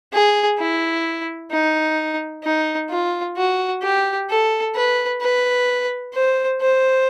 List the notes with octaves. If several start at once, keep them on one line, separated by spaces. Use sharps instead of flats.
G#4
E4
D#4
D#4
F4
F#4
G4
A4
B4
B4
C5
C5